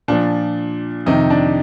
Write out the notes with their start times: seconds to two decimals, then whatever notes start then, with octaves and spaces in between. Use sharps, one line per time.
0.08 A#2 F3 D4
1.06 F2 C3 D#3 D#4
1.30 D4